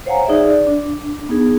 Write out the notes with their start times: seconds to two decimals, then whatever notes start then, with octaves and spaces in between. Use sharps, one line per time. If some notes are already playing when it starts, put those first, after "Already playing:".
0.06 C5 C#5 F5 F#5 G#5 A#5
0.26 D#4 G#4 D5 E5
0.46 D5
0.67 D4
1.29 B3 D#4 G#4